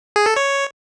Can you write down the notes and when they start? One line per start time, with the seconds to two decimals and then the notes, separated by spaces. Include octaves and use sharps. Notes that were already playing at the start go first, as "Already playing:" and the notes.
0.16 G#4
0.26 A4
0.37 C#5